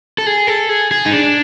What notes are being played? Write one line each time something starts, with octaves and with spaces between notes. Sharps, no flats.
A4
G#4
A4
G#4
G#4
D#4
D4